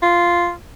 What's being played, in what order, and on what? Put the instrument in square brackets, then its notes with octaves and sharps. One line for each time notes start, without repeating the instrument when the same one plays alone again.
[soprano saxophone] F4